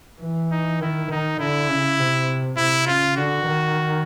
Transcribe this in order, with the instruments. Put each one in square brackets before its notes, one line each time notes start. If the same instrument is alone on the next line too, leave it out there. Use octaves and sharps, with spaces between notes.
[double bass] E3
[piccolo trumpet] D#4
[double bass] D#3 [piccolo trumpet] E4
[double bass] D#3 [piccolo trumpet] D#4
[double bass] D3 [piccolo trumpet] E4
[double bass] C#3
C3
[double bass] C3 [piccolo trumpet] E4
[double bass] C#3 [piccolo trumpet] F4
[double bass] D3 [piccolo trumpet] F#4
[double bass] D#3